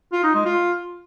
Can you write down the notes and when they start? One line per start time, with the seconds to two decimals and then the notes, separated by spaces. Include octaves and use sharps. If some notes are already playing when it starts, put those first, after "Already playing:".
0.12 F4
0.23 D#4
0.34 G#3
0.45 F4